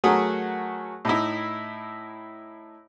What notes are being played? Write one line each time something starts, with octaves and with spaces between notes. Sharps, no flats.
F#3 A3 F#4 G#4 A#4 D#6
A2 D#4 E4